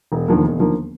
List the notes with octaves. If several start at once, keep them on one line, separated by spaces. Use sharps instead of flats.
E1
D#2 D3 F3 A#3
E1
D#2 D3 F3 A#3